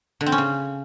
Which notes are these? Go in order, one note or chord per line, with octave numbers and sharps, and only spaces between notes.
D3
C4
C#4
C#3